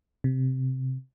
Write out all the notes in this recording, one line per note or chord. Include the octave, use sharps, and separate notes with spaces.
C3